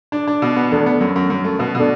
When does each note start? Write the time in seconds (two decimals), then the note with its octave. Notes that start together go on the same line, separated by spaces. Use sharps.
0.12 D4
0.27 D4
0.42 B2
0.56 B3
0.71 E2 A3 D4
0.86 B3
1.01 F#2
1.16 F#2
1.30 F#2
1.44 A3
1.59 B2 B3
1.75 B2 A3 D4